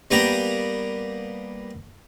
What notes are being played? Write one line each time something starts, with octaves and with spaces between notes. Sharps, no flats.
G3 A#3 B3 G5 A#5